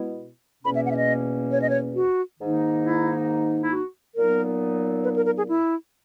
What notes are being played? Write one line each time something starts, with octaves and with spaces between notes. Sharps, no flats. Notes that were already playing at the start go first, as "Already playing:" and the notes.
Already playing: B2 G#3 B3 E4
E2 B2 A#3 C#4 B5
E5
F#5
E5
D#5
C#5
D#5
C#5
F#4
G#2 D#3 A#3 D#4
E4
E4
F#4
A#2 F#3 B3 D#4 A#4
B4
A#4
A#4
G#4
E4